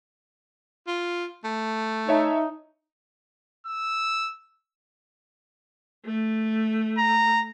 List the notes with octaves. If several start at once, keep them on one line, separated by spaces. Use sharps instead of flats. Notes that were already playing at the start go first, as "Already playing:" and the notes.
F4
A3
D#4 C#5 E5 A5
E6
A3
A#5